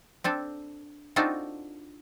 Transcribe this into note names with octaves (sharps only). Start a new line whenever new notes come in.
C4 D4 A4
C4 D4 D#4 F4 F#4 A4